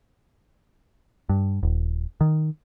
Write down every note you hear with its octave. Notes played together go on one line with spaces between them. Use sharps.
G2
D#1
D#3